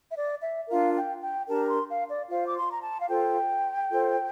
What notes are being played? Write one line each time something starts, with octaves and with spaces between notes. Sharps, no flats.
E5
D5
E5
D4 F4 A#4 F5
G5
G5
D4 G4 A#4 A5
A#5
C6
F5
D5
F4 C5 F5
D6
C6
A#5
A5
F5
F4 A4 C5 G5
F4 A4 C5